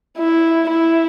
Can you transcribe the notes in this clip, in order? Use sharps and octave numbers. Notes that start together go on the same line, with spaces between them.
E4
E4